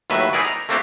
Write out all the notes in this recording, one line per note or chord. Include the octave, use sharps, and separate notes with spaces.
D#2 A2 F#3 B4 E5
D#4 E4 G#4 A#4 B4 D5
A#5
A3 A#3 C4 D4 F#4 G4